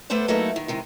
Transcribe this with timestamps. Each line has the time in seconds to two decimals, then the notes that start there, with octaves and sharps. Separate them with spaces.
0.10 A3 B3 B4 C5 D5
0.28 F#3 A3 A#3 D#4 E4
0.56 D#3
0.68 C3 D#3 G#3